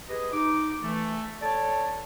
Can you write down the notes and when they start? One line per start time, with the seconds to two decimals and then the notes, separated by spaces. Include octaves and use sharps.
0.09 G4 G#4 B4 D#5
0.33 D#4 D6
0.82 E3 A3
1.42 A4 C#5 D5 A5